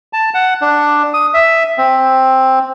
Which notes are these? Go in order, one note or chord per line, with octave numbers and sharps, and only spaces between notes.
A5
F#5
D4
D#6
E5
C4